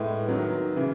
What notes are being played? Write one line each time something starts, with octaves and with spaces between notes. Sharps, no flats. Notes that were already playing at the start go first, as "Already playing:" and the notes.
Already playing: A2 G#3 B3 E4
D#3 F#3 B3
C#3 E3